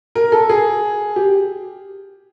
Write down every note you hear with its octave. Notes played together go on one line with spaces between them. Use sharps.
A#4
A4
G#4
G4